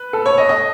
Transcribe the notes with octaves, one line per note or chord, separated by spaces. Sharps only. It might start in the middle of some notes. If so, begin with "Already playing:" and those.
Already playing: B4
A4
C#5
D#5
D#5